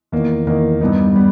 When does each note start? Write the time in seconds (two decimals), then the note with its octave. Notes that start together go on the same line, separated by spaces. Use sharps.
0.12 E2 D#3 A#3
0.47 E2 D#3 A#3
0.81 G2 G3 B3 D#4
1.15 G3 B3